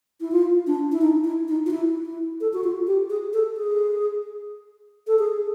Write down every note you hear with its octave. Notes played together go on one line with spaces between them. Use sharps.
E4
F4
D4
E4
D#4
E4
D#4
F4
E4
E4
A4
F#4
F4
G4
G#4
A4
G#4
A4
G#4